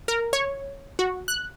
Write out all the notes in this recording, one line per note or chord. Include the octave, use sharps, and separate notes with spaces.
A#4
C#5
F#4
F#6